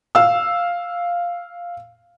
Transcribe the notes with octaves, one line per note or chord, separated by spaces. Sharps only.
F5 E6